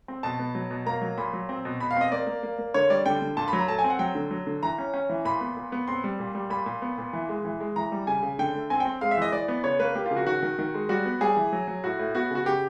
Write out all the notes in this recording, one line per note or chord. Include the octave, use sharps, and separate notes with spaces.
C4
B2 A5
B3
F#3
B2
A#3 A#5
F#3
A#2 B5
F#3
C4
B2
B2 B5
F5
C4 D#5
A#3 D5
A#3
A#3
A#3
D3 C#5
G3 D5
D3 G5
D3
A#2 A5
B5
F#3
A#5
A3 A5
G#5
C4
F#5
F#3 G5
D3
F#3
D3
E3 A#5
C#4
C#4
E3
A#2 B5
B3
A#2
B3
C4 C6
G3
A#2
G3
A#2 B5
A#2
B3
A#2
E3
G#3
E3
G#3
E3 A#5
G3
C#3 G#5
C#3
D3 G5
A3
C4 G#5
G5
C4
G#3 F5
E5
E3 D#5
E3 D5
B3
C#3 C#5
A#3 B4
A#3 G4
C#3 F4
F#4
D#3 F#4
D#3
D#3
G#3
G3 F#4
B3
G3 G#4
E3
F#3
F#3
A2 F#4
A2
B3 F#4
C#3 F#4
C#3 G4